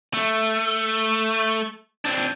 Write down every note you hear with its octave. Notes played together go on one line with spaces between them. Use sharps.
A3
C4 D4